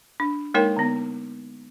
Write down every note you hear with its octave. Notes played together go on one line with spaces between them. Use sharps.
D4
G#3 A#3 D#4 A#4 C#5 G5
D3 B3